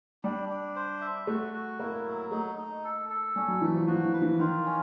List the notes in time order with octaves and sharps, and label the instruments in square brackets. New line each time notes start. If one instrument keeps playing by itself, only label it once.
[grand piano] G3 [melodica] D4
[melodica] D4
C5
E5
[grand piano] A3 [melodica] F#4
[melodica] F#4
[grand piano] A#3 [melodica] E4
[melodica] F#3
[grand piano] A3 [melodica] D#4
[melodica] D#4
A4
A4
[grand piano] G3 [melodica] C#4
[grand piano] F#3
[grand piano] E3 [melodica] A3
[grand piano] F3
[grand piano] F3 [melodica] F#4
[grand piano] E3
[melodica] B4
[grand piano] E3
[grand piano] D#3 [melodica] F4
[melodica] C#4